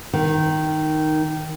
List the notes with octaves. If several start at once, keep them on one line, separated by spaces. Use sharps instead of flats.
D#3